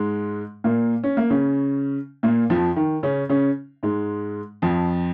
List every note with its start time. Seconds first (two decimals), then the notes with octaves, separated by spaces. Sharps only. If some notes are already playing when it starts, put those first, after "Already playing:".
Already playing: G#2 G#3
0.64 A#2 A#3
1.04 C#4
1.17 A#3
1.30 C#3 C#4
2.23 A#2 A#3
2.50 F2 F3
2.76 D#3
3.03 C#3 C#4
3.29 C#3 C#4
3.83 G#2 G#3
4.62 F2 F3